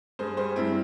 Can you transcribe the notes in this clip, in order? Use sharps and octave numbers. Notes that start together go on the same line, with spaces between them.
G2 G#4 C5
G3 G#4 C5
G2 C4 E4